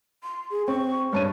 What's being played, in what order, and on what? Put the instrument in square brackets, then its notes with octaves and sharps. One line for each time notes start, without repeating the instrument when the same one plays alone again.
[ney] C6
G#4
[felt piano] C4 [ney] C#6
[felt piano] G2 A5 D#7 [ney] C#5